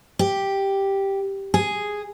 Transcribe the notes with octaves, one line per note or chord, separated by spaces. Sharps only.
G4
G#4